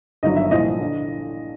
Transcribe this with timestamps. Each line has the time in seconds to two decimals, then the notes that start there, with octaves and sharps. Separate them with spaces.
0.23 G1 G2 D#3 F#3 D#5
0.36 E5
0.51 C2 A#2 F3 D#5
0.81 D3